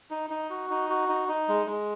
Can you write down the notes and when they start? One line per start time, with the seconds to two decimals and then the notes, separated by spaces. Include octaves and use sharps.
0.10 D#4
0.30 D#4
0.50 F#4
0.70 D#4
0.90 F#4
1.09 D#4
1.29 D#4
1.48 G#3
1.67 G#3